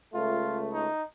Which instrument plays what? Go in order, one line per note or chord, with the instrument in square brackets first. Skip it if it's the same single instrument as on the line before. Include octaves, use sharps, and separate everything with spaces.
[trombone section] C#2 A3 [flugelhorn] F4
[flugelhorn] D#4